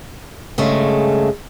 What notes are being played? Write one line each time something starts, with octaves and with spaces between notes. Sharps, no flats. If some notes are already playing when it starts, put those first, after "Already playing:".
G2 C#3 G#3 A3